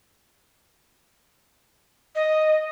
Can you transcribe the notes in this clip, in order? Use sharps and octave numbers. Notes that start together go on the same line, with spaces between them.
D#5